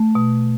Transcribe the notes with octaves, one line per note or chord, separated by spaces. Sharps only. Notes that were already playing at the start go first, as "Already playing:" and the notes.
Already playing: A3
B2